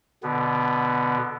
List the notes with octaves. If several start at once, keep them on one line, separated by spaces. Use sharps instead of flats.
B2 D3 B3